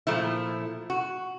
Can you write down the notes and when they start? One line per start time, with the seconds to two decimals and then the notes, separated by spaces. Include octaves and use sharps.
0.07 A#2 F3 A3 E4
0.90 F#4